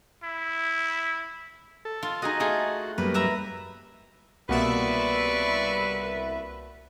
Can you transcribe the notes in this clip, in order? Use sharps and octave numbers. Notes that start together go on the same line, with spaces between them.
E4
A4
F4
D#4 F#4 G#4 D#5
A3 F4 G#4
F#2 G3 A#3 B4
B4 E5 A#5
C2 B2 A#3 B3 B4 D5 E5 C#6